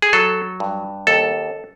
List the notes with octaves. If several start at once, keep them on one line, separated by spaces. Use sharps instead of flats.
G#4
F#3 A4
G2
D#2 A4